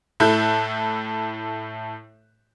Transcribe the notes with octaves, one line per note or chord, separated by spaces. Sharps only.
A2 E4 A4 F#6 G6